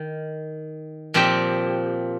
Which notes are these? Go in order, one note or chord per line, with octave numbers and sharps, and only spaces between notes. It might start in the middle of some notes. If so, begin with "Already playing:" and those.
Already playing: D#3
A#2 F3 C4 G4